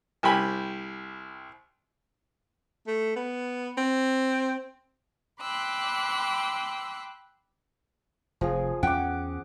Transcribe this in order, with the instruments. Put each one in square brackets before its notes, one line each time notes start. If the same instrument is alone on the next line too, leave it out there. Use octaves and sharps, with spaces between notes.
[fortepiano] C2 G4 G#5 B5
[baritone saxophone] A3
B3
C4
[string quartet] G5 B5 C6 D6 E6 F#6
[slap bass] F1 [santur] F3 G#4
[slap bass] E2 C#4 [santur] F#5 D6 [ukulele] G5